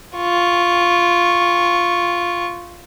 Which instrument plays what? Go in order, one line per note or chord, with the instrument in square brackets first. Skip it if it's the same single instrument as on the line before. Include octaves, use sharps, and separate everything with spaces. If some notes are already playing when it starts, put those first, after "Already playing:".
[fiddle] F4 C#6